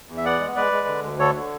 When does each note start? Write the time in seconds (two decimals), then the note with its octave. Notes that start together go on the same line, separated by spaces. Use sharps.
0.08 E2
0.17 E5
0.25 B3 D5 F#5
0.40 G#3
0.56 G#3 B4 D5
0.72 G#3
0.87 D3
1.03 D2
1.19 D3 A4 C#5
1.35 D3